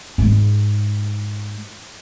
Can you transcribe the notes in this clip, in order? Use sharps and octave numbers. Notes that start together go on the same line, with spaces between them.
G#2 G#3